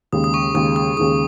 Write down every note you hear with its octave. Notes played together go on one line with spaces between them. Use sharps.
D#2 C#3 G#3 D#6
D#6
C#6
D#2 C#3 G#3 D#6
D#6
D#2 C#3 G#3 D#6